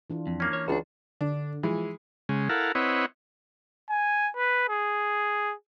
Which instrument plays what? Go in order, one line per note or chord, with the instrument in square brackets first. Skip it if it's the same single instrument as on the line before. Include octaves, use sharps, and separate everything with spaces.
[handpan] E3 D4 F4
[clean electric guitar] F2
[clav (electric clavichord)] A#3 C#4
[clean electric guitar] C#5
[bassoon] C#2 [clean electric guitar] D4 F4 F#4
[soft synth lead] D3 [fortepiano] D4
[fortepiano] E3 G#3 [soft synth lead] F3
[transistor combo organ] C#3 G#3
E4 A4 A#4 F5 F#5
C4 E4 B4 C#5 D#5 F#5
[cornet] G#5
B4
G#4